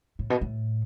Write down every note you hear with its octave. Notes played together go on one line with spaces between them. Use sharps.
A2
B2
A2